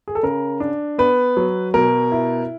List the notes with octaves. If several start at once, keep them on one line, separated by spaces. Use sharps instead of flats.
G#4
A4
C#3 A#4
D4
B3 B4
F#3
B2 A#4
E4